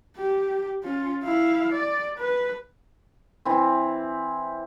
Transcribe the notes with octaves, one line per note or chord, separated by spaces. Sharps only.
G4
C#4 F4
E4 F5
D5
B4
E3 C4